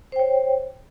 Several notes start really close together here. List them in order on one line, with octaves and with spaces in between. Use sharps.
C5 G5 C#5